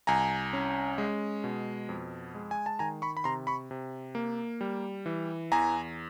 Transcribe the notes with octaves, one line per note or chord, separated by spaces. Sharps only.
C2 G#5 A#5
C#4
G#3
B2
F2
G#3
G#5
A5
D#3 G#5 A#5
B5 C#6
B5
C3 A#5 C6
B5 C#6
C3
A#3
G3
E3
E2 G#5 A#5